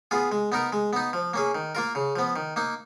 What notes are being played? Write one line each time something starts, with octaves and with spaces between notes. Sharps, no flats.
B3 F4 G#4
G#3
B3 D#4 A#4
G#3
B3 D#4
F3
A#3 C#4 G#4
D#3
A#3 F4 A#4
C#3
F3 B3
D#3
A#3 D#4